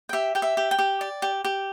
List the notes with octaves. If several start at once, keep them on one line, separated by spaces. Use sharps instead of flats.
G5
G4 E5
G4 G5
E5
G4
G5
G4
D5
G4
G4